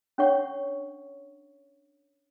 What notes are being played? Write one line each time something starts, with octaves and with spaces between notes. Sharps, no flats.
C#4 D4 C#5 F#5 C#6